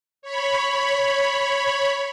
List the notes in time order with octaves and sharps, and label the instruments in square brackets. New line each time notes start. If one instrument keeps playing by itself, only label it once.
[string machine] C#5 B5